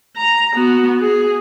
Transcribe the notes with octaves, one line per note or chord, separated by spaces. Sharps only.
A#5
B3 F#4
G#4